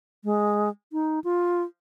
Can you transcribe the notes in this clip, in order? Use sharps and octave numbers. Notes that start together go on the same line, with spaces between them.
G#3
D#4
F4